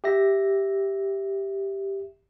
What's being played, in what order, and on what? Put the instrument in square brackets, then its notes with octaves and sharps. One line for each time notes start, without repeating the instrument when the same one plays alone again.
[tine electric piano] G4 E5 A#6